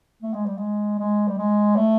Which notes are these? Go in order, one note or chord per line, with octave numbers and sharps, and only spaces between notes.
A3
G#3
G3
G#3
G#3
G3
G#3
A3